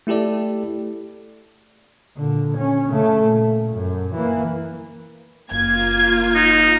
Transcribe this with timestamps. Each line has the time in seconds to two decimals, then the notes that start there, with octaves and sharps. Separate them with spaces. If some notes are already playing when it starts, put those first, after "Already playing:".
0.07 A3 E4 G4 A4 D5
2.17 A#2 D3
2.57 C#4
2.88 C#3 A3
3.21 A#2
3.74 F#2
4.14 E3 A#3
5.51 F#1 A#3 F4 G#6
6.35 D#4